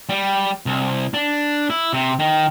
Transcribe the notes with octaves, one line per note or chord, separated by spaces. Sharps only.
G3
C2
D4
E4
C3
D#3